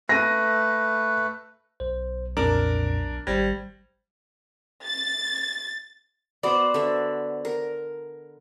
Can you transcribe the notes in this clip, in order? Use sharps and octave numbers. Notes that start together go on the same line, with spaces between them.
A3 B4 A#6 D#7
B1 C5
F2 A#2 D4 A#4
G#1 G3 C5 G#6 A#6
A6
B3 F#4 C5 D5
D3 E5
A#4